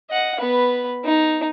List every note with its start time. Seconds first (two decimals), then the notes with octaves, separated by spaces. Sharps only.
0.10 D#5 F#5
0.39 B3 B4
1.04 D#4